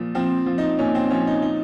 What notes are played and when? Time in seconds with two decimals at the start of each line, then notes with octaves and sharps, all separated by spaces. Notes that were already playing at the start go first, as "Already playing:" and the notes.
Already playing: A#2 F3
0.15 F3 C4
0.46 F3
0.58 D#4
0.79 A#2 C#4
0.95 C4
1.10 F3 C#4
1.27 D#4
1.42 D#4